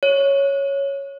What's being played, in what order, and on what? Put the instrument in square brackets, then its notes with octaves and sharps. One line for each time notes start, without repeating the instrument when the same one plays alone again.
[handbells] C#5